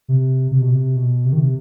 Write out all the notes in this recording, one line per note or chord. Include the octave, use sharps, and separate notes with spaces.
C3
C3
B2
C3
B2
C3
D#3
C3